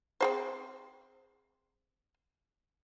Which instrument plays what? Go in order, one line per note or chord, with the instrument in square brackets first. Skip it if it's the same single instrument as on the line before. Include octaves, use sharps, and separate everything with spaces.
[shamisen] C4 G#4 C5